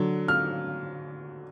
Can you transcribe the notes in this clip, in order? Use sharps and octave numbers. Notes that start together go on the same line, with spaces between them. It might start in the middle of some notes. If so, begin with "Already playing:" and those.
Already playing: D3 F#3
F6